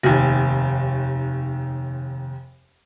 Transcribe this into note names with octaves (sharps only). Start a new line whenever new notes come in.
F1 D#2